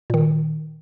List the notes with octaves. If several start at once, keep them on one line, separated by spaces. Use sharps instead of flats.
A#2 D#3